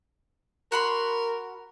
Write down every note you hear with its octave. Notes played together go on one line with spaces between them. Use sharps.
F#4 A#4 B5 C6